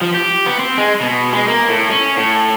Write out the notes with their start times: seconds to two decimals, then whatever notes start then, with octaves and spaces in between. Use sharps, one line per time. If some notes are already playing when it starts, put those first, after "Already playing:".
0.01 F3
0.14 G4
0.47 B3
0.60 C4
0.78 G#3
1.01 B2
1.33 G#3
1.48 A#3
1.69 A2
1.90 C#4
2.17 A2